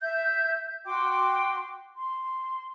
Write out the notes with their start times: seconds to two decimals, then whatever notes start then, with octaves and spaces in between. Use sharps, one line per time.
0.01 E5 G6
0.85 F#4 G5 C6 D6
1.95 C6